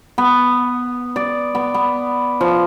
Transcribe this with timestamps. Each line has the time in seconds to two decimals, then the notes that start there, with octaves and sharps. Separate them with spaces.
0.18 B3
1.16 D5
1.55 B3
1.74 B3
2.41 F3